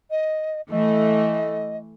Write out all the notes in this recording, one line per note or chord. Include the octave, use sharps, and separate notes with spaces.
D#5
E3 A3 D#5